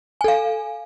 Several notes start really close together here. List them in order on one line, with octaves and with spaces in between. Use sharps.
G#5 A4 F5